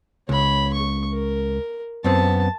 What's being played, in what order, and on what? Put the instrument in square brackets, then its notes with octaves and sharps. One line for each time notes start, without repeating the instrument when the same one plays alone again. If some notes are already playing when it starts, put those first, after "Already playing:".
[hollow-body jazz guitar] C#2 [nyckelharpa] C#5 B5
[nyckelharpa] C#6
A#4
[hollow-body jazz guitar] F#2 B3 C4 [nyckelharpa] A5